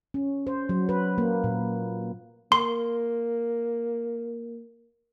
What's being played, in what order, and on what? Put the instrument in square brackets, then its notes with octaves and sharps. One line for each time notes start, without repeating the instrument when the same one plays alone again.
[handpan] C#4
C5
F#3
B4
A#3
A#2
[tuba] A#3 [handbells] C6